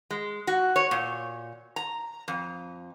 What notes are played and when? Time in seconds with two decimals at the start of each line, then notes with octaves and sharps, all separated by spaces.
0.10 G#3
0.47 F#4
0.76 C#5
0.91 A#2
1.76 A#5
2.28 F2